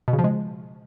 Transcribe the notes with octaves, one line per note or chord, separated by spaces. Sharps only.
B2
C#3
F3
G#3